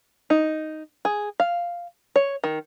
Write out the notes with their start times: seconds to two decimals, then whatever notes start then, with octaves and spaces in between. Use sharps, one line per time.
0.30 D#4
1.05 G#4
1.40 F5
2.16 C#5
2.44 D#3